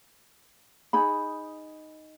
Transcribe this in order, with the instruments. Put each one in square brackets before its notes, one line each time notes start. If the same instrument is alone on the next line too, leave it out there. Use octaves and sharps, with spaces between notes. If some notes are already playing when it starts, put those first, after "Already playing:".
[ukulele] D#4 G#4 B5